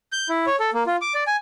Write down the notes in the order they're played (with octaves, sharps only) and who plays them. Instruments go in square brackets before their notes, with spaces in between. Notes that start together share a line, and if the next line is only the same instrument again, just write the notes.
[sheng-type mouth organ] G6
E4
C#5
A4
A#3
F4
D6
D5
G#5